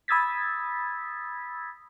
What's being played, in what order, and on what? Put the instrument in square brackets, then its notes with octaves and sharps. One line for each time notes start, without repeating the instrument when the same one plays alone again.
[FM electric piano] B5 D#6 E6 G#6 A6 B6